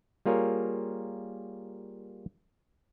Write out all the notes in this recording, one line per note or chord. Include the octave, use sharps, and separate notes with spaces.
G3 A#3 F4 G#4 A#4 C#5